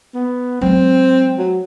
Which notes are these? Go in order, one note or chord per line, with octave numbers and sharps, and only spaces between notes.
B3
F#3 G#3 C4
F#3